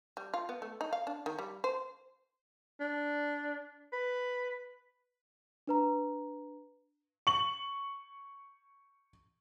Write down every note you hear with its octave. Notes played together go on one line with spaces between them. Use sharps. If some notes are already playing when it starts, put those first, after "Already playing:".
G3
F4
B3
A3
D#4
F5
D4
D#3
G3
C5
D4
B4
D4 B4 A#5
C#6 F#7